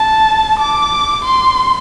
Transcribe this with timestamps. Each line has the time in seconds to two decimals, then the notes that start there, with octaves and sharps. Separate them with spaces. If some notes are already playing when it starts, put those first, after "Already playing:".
Already playing: A5
0.60 D6
1.25 C6